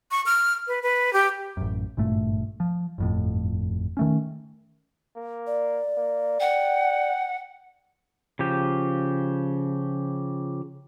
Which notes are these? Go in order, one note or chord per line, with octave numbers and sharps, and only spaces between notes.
C#6
F6
B4
B4
G4
A1 F#2
G#1 G2 A#2 A3
F3
G1 F2 A2
D#3 A3 C#4
A#3
D5
A#3
F#5 G5
C#3 F3 G4